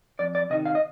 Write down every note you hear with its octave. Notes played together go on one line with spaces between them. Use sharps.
F2 D5
D5
C3 D#3 D#5
F5
D#5